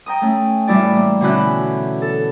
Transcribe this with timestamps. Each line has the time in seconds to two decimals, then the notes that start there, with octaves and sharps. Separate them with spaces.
0.06 G5 A#5 D#6
0.21 A3 C#4
0.67 A2 E3 G3 E4 D5
0.96 A#3
1.21 B2 D3 E3 C#4 E4 F#6
2.02 A4